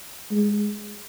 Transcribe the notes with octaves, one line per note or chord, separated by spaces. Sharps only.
G#3